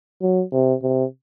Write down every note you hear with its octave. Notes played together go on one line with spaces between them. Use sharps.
F#3
C3
C3